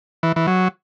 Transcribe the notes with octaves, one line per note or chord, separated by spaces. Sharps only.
E3
E3
F#3